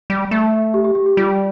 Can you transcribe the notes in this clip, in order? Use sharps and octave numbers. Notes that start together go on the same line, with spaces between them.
G3
A3
G4
G4
G4
G4
G3 F4